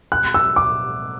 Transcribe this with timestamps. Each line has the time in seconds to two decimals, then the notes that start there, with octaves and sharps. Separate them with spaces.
0.12 F#6
0.34 E6
0.56 D6